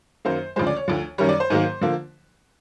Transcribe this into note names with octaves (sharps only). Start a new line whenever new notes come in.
F#2 D#3 F#3 A#3 C5
D2 C#3 F3 G#3 C5
D5
C#5
D2 D3 F3
F#2 D#3 G3 C#5
D5
C5
G#2 D#3 F#3 A#3
D3 F3 A#3